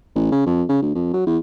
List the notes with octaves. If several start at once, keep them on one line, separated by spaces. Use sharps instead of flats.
A1
C#3
F2
C#3
D2
F2
F#3
E2